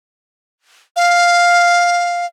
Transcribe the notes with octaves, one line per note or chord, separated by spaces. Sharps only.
F5